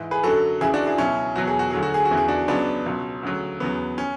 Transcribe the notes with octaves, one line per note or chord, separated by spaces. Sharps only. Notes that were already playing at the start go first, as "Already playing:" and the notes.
Already playing: G#2 E3
G#4 B4
F#2 D3 F#3 F#4 A4
C#2 C#3 E3 E4 G#4
D4 F#4
E4 G#4
C#2 B2 F#3 C#4 E4
E2 B2 F#3 F#4
G#4
F#4
D2 D3 F#3 G#4
F#4
G#4
F#4
E2 C#3 E3
G#4
D4 F#4
C#2 C#3 F#3 B3 D4
C#2 B2 F#3
D2 C#3 F#3
E2 C#3 F#3 B3
C#4